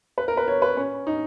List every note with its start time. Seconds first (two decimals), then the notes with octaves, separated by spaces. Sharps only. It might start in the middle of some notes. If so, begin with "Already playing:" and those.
0.18 B4
0.28 A#4
0.37 B4
0.48 C#5
0.62 B4
0.77 C#4
1.07 D#4